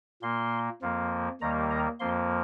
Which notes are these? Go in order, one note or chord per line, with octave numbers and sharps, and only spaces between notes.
A#2 A#3 C6
F2 F3 A#3
D#2 D#3 G3 A#3 A#5
A#5
F2 F3 A#3 C6